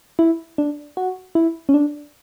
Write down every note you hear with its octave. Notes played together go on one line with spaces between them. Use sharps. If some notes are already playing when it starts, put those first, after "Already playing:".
E4
D4
F#4
E4
C#4
D4